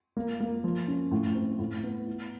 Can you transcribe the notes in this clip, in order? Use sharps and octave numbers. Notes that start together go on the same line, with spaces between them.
A#3
A#3
F3
C#4
A2
C4
A2
B3
E4